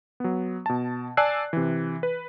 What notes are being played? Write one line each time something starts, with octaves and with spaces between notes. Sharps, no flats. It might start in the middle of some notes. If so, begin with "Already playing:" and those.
F#3 B3
B2 A5
D5 G#5 A5 E6 F#6 C7
C3 E3
B4